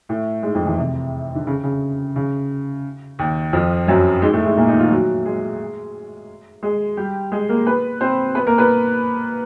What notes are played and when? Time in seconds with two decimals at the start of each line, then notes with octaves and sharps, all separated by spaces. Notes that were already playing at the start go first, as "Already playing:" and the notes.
0.09 A2 A3
0.43 G#2 G#3
0.54 F2 F3
0.66 E2 E3
0.78 C3
1.35 D3
1.47 C#3
1.63 C#3
2.16 C#3
3.19 D#2 D#3
3.53 F2 F3
3.87 F#2 F#3
4.22 G#2 G#3
4.33 A2 A3
4.45 G#2 G#3
4.57 A#2 A#3
4.68 D#3 D#4
4.79 F3 F4
4.91 F#3 F#4
5.25 G#3 G#4
6.63 G#3 G#4
6.97 G3 G4
7.32 G#3 G#4
7.49 A#3 A#4
7.66 B3 B4
8.01 C4 C5
8.35 B3 B4
8.47 A#3 A#4
8.58 B3 B4